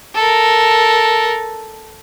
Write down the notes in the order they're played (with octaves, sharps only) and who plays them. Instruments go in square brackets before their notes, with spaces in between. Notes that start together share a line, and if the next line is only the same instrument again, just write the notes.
[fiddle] A4 A#4